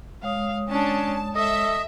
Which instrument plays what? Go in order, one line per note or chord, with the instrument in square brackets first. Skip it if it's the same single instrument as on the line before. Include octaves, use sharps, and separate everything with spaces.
[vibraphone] G#3 C#5 D#6 [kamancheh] F5
[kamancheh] C#4 D4 [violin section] A5
[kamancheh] A4 [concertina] D#5 [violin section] E5